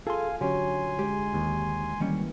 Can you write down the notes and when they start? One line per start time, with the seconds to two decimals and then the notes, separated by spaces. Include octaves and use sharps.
0.07 F4 G#4 A4 F5 G#5 C6
0.41 D3 F#3 C#4 F#4 G4 G#5 C6
0.99 G#3 G4
1.34 D#2
2.00 D#3 E3 G3 A#3 C#4